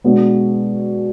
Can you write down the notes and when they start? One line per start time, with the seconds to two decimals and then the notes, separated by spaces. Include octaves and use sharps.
0.04 B2 G#3 B3 D4